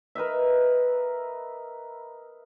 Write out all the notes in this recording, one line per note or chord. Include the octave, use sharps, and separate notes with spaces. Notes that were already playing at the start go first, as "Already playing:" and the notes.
A#4 B4 D#5 E5